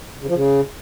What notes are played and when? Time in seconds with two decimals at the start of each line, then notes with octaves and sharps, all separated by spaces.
0.22 C#3
0.28 F3
0.34 C#3